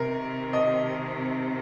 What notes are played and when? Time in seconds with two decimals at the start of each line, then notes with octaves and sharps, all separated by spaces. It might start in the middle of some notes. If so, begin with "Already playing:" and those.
Already playing: C3 D#3 C4 A#4
0.53 D#5